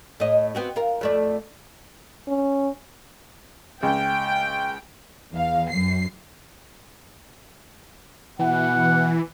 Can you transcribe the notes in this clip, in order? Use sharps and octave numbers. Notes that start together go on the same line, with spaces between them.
A2 D#5
B3 C4 F#4
F4 A#4
F2 A3 D5
C#4
C#2 G5
E2 F5
F#2 C7
B2 E3 F#5